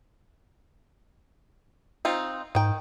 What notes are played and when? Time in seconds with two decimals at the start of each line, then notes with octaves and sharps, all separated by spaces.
2.05 C4 D#4 F4
2.55 G#2 D#3 G5